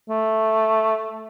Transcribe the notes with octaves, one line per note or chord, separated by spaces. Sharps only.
A3